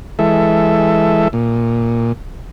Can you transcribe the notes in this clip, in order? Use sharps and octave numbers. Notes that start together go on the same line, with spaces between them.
E3 G#3 A4 E5
A#2